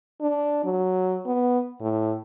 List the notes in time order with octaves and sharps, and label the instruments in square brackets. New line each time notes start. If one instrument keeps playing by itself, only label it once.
[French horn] D4
F#3
B3
A2